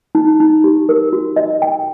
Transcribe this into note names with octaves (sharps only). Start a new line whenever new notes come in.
D#4
D#4
G4
A#4
F#4
D#5
G5